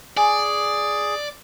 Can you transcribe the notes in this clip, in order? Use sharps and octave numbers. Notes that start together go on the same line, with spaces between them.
G#4 D5 G#5